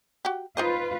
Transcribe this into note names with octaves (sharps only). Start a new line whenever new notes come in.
F#4 G4
D#4 F4 B4 C5 D#5